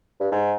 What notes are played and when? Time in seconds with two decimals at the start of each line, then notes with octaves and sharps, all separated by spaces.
0.21 G2
0.32 G#2